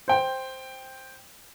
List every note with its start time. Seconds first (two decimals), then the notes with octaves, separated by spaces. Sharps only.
0.08 C5 G5